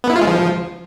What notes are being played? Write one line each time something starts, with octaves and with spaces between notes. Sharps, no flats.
B3
E4
F4
G#3
F3